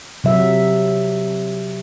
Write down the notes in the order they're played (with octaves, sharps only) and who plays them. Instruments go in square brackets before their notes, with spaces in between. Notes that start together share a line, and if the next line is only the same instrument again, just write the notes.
[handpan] C3 F#3 E5